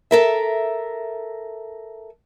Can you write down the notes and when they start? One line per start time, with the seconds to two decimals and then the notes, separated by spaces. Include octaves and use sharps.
0.11 A4 A#4 E5